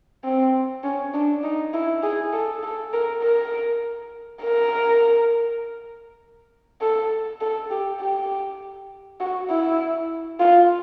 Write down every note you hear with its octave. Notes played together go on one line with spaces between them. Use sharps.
C4
C#4
D4
D#4
E4
G#4
A4
A4
A#4
A#4
A#4
A4
A4
G4
G4
F#4
E4
F4